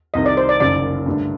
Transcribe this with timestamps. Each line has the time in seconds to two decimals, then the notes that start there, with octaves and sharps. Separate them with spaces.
0.14 C2 C3 D#3 D#5
0.26 D5
0.37 C5
0.49 D5
0.60 F#1 F#2 D#3 D5
1.06 G2 D3 A3 D4